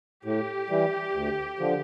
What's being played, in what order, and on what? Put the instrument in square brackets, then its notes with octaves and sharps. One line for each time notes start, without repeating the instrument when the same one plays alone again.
[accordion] A2 [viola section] G4
[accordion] E3 G3
D2
D3 F3